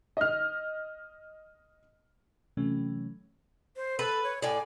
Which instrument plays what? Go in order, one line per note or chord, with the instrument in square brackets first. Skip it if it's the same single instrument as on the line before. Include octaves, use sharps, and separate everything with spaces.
[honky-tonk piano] D#5 F6
[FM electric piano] C3 E3 F#3 A3 C#4
[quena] C5
[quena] A4 [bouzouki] B4
[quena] C#5
[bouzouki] A2 D5 [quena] G#5